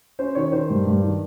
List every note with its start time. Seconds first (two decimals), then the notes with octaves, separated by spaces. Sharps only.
0.19 C#4 C5
0.35 D#3 C#5
0.52 D#3 C5
0.70 G2
0.86 G2
1.03 D#3